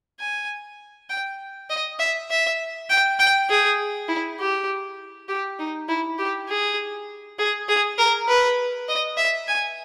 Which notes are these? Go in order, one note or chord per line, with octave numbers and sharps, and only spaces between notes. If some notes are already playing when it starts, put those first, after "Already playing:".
G#5
G5
D#5
E5
E5
G5
G5
G#4
E4
G4
G4
D#4
E4
G4
G#4
G#4
G#4
A#4
B4
D#5
E5
G#5